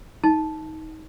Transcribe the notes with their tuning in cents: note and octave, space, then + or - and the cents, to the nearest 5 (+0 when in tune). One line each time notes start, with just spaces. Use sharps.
D#4 +20 A5 -10